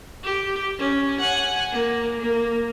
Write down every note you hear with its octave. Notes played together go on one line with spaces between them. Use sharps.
G4
C#4
F#5 G#5
A#3
A#3